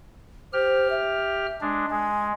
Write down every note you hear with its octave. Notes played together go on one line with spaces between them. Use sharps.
G4 C5 F6
E5
G#3 D4
G#3 G#5